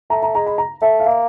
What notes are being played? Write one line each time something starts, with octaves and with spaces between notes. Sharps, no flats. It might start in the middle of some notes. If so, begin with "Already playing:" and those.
A3 A#5
A#5
G#3 A#5
B5
A#5
A3 E5
F5
A#3 E5